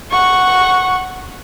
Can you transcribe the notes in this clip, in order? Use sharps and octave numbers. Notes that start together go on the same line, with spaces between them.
F#5 C#6